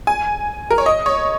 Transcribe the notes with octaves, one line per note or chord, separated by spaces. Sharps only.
G#5
A#4
C#5
D#5
C#5